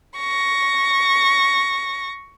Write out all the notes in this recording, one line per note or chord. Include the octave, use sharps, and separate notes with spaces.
C#6 A#6